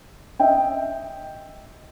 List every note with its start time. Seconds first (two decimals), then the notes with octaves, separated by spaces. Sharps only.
0.39 D#5 E5 G5